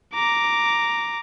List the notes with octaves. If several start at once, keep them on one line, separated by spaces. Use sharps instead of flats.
A#5 D6